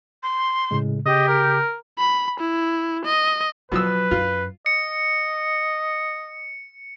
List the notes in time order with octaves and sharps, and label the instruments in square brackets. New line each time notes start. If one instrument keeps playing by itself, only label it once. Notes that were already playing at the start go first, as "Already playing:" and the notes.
[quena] C6
[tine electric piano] A2 C#3 G#3
[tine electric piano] C#3 [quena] G4 [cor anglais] D#5
[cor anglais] A#4
[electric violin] B5
E4
D#5
[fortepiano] B2 F3 E6 [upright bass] F#3 [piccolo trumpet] B4
[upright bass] F#2 [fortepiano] F4
[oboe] D#5 [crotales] C#7